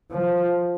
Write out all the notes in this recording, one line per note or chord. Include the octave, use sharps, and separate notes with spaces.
F3